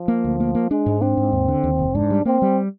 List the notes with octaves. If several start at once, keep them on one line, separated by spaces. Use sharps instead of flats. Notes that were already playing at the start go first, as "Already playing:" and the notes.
Already playing: F3
A#3
D2
A#3
A#3
G#3 D4
G#2
C4 D4
G#2
D#2
D3
D#2
F1
G#2 D4
G3
A#3 C4
G3